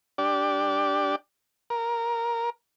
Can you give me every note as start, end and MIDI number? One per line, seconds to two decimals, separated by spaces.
0.18 1.16 62
0.18 1.16 67
0.18 1.16 74
1.70 2.50 70